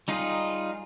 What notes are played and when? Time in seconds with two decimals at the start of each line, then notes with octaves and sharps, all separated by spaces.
0.08 G3 D#4 F4 G#4